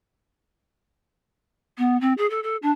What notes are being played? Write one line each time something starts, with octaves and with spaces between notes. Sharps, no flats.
B3
C4
G#4
A4
A4
D4